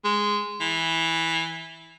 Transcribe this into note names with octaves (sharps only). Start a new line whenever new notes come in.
G#3
E3